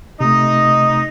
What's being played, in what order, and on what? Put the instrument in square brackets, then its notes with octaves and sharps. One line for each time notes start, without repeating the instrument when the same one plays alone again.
[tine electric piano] C3 A3 [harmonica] D#4 D#5